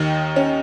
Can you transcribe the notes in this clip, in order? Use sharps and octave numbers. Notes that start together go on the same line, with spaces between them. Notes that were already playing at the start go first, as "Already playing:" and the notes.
Already playing: D#2 D#3 D#4
C#4